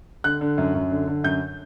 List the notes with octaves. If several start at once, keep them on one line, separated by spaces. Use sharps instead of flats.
D3 F#6
D3
F#2
F#2
D3
D3
F#2 G6